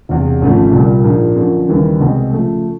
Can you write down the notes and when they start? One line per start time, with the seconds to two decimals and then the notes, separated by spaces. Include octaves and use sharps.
0.09 E1 E2 C3
0.41 G#1 F#2 C#3 F3 A3
0.72 C2 A#2 G3 A#3
1.04 A#1 G#2 F3 A#3
1.36 F#2 D3 F3 A#3
1.68 D#2 C#3 E3 G3 A#3
2.00 C2 B2 G#3 C4
2.31 C#3 F3 A3